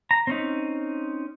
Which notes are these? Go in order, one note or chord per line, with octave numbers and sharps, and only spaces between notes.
A#5
C4 C#4 D#4